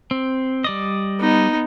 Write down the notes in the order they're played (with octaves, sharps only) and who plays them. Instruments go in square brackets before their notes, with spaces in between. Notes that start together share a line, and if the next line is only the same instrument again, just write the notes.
[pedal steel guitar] C4
G3 D5 D#5
[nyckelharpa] B3 D#4